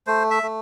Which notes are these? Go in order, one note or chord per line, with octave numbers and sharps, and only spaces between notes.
A3 C5
E5
A3